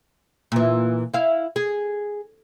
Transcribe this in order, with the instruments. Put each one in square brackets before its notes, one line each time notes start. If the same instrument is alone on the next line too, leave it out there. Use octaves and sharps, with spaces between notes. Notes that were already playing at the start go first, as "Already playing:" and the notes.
[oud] A#2 E3
E4 F5
G#4